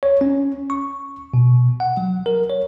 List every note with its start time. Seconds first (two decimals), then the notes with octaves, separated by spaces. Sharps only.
0.03 C#5
0.21 C#4
0.70 C#6
1.34 B2
1.80 F#5
1.97 F#3
2.26 A#4
2.50 C#5